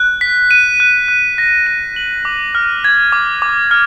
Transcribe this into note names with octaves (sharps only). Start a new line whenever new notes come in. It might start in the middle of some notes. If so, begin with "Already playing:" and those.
Already playing: F#6
B6
D#7
F#6
F#6
A#6
D#7
F#7
D6
F6
G#6
D6
D6
F6